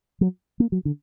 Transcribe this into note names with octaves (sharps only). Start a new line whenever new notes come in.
F#3
A#3
F#3
D3